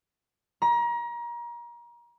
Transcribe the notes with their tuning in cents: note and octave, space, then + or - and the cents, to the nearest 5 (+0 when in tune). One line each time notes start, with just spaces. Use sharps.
A#5 +30